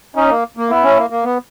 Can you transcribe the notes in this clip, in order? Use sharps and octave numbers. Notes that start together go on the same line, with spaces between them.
C#4 D#4
A#3
A#3
B3 E4
C#4
A#3
A#3
B3